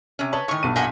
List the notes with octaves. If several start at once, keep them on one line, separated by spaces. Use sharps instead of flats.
C3 C#4
B4 C#5 D#5 A5
A2 D#3 G#5 C#6
B1 G2 D#7
A#2 D#5 E5 F#5 G#5